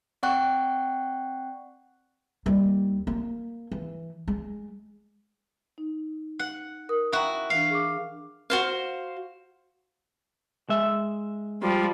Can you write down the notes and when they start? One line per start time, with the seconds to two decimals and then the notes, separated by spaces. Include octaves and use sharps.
0.23 C4 D5 F#5 G5 C#6 F#6
2.46 D#2 G3
3.07 A#3
3.72 E3
4.28 G#3
5.78 D#4
6.39 F#5
6.89 A#4 D#6
7.12 E4 F#4 E5 G5 A#5
7.50 E3 D4 F5
7.70 G#4 C#6 D6
8.50 F#4 C5 F5
10.69 G#3 E5
11.62 F3 G3